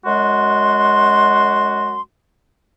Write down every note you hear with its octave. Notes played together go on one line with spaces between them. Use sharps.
F#2 G#3 F#4 C6